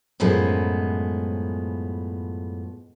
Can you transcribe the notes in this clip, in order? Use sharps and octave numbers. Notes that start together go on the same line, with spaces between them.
F#2 A2 F3 G#3 B3